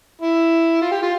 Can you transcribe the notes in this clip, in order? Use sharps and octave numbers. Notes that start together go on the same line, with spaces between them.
E4
F4
G4
F4